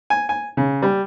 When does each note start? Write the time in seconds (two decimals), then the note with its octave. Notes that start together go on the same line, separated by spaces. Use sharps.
0.10 G#5
0.29 G#5
0.57 C#3
0.82 G3